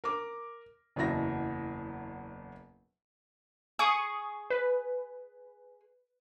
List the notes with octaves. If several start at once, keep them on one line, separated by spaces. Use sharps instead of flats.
A#4 D6
F#1 E2 B2 F#3 E5 A#6
G#4 C#6 D#6
B4